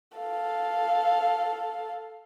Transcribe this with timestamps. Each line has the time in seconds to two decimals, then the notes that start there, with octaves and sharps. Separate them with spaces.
0.17 A4 F5